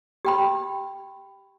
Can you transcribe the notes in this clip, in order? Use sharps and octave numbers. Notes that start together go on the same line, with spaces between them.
G4 G5 B5